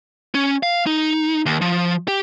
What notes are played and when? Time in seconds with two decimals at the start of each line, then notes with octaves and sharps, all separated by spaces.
0.35 C#4
0.63 F5
0.87 D#4
1.46 D#2
1.61 F3
2.08 G4